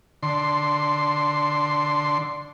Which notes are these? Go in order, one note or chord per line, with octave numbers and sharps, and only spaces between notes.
D3 C6